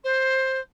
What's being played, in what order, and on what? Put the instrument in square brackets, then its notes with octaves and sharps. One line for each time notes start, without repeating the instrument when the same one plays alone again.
[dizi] C5